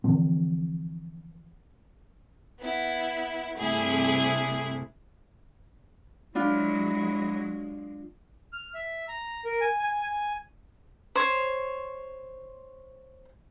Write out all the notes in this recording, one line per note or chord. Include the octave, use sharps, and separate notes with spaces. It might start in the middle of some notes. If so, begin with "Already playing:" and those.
D3 E3 F3 C4
B3 E4
G2 C3 A3 E4 G#4
F#3 G#3 D4 E4 F4
F6
E5
A#5
A#4
G#5
G#5
G#5
C5 C#5